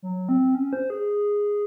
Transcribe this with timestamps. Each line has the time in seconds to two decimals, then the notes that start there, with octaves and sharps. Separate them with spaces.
0.02 F#3
0.29 C4
0.55 C#4
0.73 C5
0.90 G#4